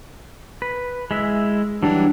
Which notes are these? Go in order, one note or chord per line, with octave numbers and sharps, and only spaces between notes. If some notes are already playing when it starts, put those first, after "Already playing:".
B4
G#3 E4 E5
E3 F#3 G3 D4